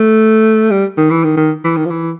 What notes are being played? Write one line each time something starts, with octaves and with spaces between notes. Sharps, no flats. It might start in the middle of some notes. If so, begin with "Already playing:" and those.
Already playing: A3
G3
D#3
E3
D#3
D#3
E3
D#3
F3
E3